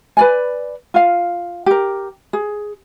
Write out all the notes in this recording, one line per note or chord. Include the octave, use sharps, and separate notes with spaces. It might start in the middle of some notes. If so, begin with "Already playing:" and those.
B4 D5 G#5
F4 F5
G4 A#4
G#4